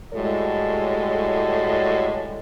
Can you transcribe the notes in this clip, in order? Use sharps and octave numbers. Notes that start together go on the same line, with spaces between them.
A2 G3 G#3 F#4 A4 C#5